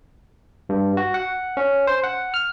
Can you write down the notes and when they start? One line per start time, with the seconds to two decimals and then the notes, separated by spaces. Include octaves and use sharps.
0.69 G2
0.97 F#4
1.14 F#5
1.57 C#4
1.87 C5
2.04 F#5
2.34 F6